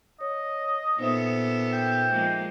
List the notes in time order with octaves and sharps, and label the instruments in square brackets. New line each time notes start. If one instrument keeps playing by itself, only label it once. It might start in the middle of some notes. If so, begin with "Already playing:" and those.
[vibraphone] C#5 [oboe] D#5
[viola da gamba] A#2 B3 A4 [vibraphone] D#4 C5 E5
[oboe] G5
[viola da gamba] F3 G#3 A#3